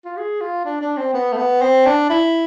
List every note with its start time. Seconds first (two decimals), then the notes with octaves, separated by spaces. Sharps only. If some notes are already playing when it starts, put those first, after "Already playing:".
0.05 F4
0.17 G#4
0.41 F4
0.65 D4
0.81 D4
0.97 C4
1.14 B3
1.33 A3
1.37 B3
1.62 C4
1.86 D4
2.10 E4